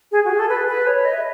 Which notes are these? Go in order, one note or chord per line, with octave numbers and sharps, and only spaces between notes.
G#4
F#4
G#4
A4
B4
B4
C#5
D#5
E5